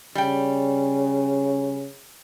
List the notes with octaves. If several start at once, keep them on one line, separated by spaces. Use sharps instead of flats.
C#3 G3 G5